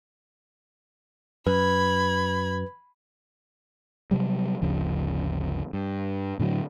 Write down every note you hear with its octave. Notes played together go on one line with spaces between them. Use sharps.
F#2 B4 B5 G#6
C3 F#3 G3
G1 D2 C#3 F3
G2
A2 D3 F3 F#3